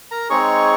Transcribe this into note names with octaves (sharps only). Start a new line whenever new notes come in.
A#4 A#5
G#3 C4 D#4 G#4 C#5 C#6